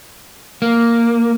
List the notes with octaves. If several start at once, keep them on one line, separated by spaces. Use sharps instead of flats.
A#3